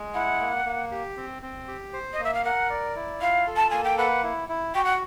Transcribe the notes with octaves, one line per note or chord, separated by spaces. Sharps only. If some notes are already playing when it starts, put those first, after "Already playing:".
Already playing: G#3
E4 F#5
A#3
A#3
G4
C4
C4
G4
C5
D#5
A#3
E5
F5
A#4 F#5
D5
E4
F4 F5
A4
A5
A#3 G#5
G5
B4 F#5
E4
E4
F#4 G5
F#5